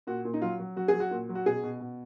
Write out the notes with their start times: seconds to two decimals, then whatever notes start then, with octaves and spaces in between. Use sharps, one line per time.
0.07 A#2 F#4
0.25 A#2
0.34 D#4
0.42 F#3 F4
0.60 F#3
0.76 F#3 F#4
0.88 G#4
0.94 F#3
1.00 F#4
1.11 A#2
1.29 F#3
1.35 F#4
1.46 B2 G#4
1.63 B2
1.81 B2